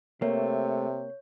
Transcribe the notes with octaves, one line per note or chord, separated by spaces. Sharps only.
C3 A3 A#3 C#5